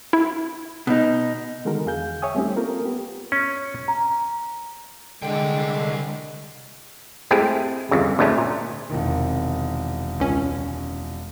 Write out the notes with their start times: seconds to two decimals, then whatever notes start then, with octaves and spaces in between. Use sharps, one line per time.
0.13 E4
0.87 B2 D#4
1.65 D3 D#3 G#3 F#4 A4 A#4
1.86 E2 G#4 F5 G#5 G6
2.22 C#5 E5 G5 G#5 D#6
2.35 G3 A3 C4 C#4 D#4 G4
2.56 A#3 F4 A4 A#4
2.86 B3 G4
3.32 C#4
3.88 A#5
5.22 C2 D3 G#3 G5
7.31 G#3 A3 C4 E4 G4 G#4
7.91 G1 F2 C#3
8.19 D2 A2 G#3 A3 C#4
8.38 A#2
8.90 E1 C3 D#3
10.20 C#2 C#4